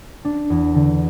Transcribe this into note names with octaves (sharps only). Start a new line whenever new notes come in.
D4
E2
D3